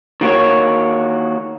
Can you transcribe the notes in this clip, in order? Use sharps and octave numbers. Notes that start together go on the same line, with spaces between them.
D#3 A#3 F#4 C#5